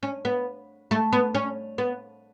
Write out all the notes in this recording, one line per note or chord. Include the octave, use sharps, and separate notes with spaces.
C#4
B3
A3
B3
C#4
B3